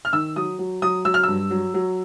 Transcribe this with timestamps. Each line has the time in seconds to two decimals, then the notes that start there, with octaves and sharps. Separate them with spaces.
0.05 F6
0.13 D#3 E6
0.36 F#3 D#6
0.59 F#3
0.82 F#3 D#6
1.05 F#3 E6
1.14 F6
1.23 G2 E6
1.51 F#3
1.74 F#3